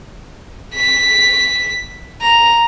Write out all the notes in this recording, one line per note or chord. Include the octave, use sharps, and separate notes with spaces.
B6
A#5